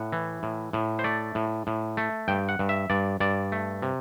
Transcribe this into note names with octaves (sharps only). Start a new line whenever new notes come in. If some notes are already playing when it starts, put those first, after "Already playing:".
Already playing: A2 F#5
E3
A2
A2
C5
A3 D5
A2
A2
A3
G2 G5
F#5
G2
E5
G2 D5
G2 D5
A3
C3